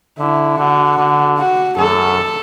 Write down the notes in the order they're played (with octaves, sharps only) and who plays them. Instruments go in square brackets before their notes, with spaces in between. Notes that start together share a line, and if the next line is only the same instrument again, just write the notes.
[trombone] D3 [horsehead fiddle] E4
[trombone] D3 [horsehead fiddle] F#4
[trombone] D3
[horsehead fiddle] F#4
[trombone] F#2 [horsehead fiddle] A4